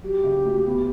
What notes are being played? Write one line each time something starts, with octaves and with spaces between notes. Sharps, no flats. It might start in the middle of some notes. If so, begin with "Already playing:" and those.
F#3 G4
C#3
D2
B3